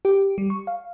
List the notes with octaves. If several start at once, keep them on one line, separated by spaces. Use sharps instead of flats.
G4
G3
C#6
F5